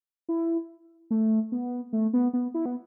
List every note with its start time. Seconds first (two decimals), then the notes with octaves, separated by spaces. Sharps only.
0.29 E4
1.11 A3
1.52 B3
1.93 A3
2.13 B3
2.33 B3
2.54 E4
2.65 B3